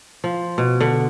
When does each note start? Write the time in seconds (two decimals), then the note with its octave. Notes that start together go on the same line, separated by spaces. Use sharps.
0.24 F3
0.58 B2
0.81 D3